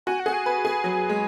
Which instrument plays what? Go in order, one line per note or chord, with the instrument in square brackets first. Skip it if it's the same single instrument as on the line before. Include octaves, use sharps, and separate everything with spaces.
[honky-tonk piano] F#4 [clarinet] G#5
[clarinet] F#5
[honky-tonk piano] G#4
[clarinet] G#5
[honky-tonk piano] B4
G#4
F#3
G#3